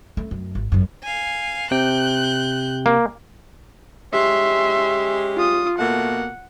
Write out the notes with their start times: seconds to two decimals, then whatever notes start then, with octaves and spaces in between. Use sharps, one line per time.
0.17 A3
0.31 F#2
0.55 G#1
0.72 G#1 F#2
1.03 F5 G#5
1.71 C3 G5 F#6 G6
2.86 A#3
4.13 G#3 C#4 G4 E5 C6
5.36 F4 D#6
5.79 B2 A3 A#3 F#5